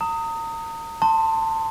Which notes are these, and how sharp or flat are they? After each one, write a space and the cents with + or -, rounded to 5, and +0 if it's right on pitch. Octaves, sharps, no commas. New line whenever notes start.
A#5 -35 D#6 +15
A5 +25 C6 +0